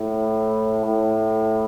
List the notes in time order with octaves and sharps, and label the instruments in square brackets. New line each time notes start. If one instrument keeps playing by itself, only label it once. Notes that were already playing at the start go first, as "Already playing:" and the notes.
Already playing: [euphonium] A2
A2